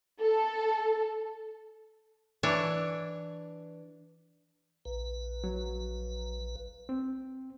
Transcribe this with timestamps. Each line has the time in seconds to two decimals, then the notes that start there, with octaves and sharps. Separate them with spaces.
0.22 A4
2.43 E3 D4 C#5
4.85 A#1 B4
5.44 F#3
6.89 C4